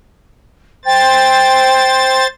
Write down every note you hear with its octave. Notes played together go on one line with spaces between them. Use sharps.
C5 G5 A6